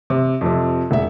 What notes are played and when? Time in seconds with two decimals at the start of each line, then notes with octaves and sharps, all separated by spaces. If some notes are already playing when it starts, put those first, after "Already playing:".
0.10 C3
0.41 F2 C3
0.91 E1 E5